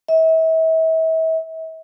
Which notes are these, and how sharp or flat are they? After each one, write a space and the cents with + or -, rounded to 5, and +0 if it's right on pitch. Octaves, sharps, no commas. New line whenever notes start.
E5 -40